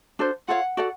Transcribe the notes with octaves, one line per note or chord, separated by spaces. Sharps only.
D4 F#4 A4 C5
F4 A4 C#5 F5 F#5
F#4 A4 D5 F#5